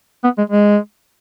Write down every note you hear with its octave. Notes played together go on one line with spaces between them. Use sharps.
B3
G#3
G#3